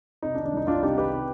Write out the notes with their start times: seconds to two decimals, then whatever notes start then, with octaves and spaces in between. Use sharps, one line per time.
0.22 C3 D#4
0.35 D4
0.38 D#3
0.45 D4
0.53 C2 D#4
0.67 C2 D4 F4
0.82 C3 D#4 G4
0.97 D#3 G4 B4
1.12 C3